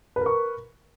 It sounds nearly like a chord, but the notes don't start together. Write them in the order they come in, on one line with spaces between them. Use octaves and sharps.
B4 A#4 C#6